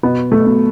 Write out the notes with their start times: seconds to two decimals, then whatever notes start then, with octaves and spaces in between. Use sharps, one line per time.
0.03 B2 B3
0.32 A3
0.46 B2